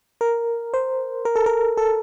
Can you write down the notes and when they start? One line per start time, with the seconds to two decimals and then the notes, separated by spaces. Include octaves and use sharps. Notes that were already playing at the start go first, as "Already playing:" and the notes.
0.21 A#4
0.74 C5
1.25 A#4
1.35 A4
1.46 A#4
1.77 A4